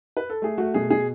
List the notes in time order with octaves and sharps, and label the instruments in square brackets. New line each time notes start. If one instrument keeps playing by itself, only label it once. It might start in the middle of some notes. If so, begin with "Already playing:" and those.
[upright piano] B4
A4
A3 G#4
A3 F#4
B2 G#4
B2 G#4